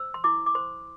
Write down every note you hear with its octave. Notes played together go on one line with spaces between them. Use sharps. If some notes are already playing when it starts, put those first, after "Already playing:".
Already playing: C5 E6
C6
E4 D6
D6
C5 C6